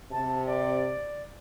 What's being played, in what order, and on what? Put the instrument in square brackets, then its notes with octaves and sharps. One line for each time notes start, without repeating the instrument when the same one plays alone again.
[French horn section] C3 [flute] A5
[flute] D5